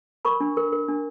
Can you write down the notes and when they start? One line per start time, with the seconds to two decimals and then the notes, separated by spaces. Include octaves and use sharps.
0.25 A#4 B5 C#6
0.41 D4
0.57 A#4
0.72 A#4
0.89 D4